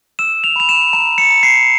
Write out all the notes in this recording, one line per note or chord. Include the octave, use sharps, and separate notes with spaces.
E6 E7
F7
B5 F7
E7
A#5 E7
C#7
A#5
C7